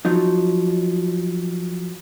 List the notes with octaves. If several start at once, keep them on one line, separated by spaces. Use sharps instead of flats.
F3 F#3 D#4